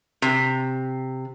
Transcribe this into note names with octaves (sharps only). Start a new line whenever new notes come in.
C3